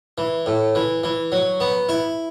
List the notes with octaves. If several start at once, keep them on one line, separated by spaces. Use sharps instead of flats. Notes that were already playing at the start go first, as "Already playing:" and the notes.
E3
A2
E3
E3
F#3
B3
E4